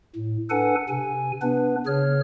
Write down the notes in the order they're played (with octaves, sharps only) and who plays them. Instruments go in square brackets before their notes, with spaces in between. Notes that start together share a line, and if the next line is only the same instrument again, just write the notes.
[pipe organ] A2
D4 A4 B4 F#5 G#5
C3 G#5
B3 D4 B4
C#3 G#4 C#5 F6